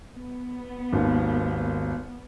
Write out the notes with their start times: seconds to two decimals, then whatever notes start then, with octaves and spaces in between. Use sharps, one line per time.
0.16 B3
0.93 G#1 D#2